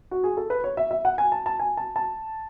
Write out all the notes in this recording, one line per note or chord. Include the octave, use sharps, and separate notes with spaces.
F#4
G#4
A4
B4
C#5
E5
E5
F#5
G#5
A5
A5
G#5
A5
A5